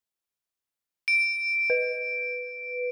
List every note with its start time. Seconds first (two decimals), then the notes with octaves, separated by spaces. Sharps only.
1.08 D7
1.70 B4